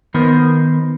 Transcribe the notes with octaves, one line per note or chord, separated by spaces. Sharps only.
D#3 B3 A#4 C5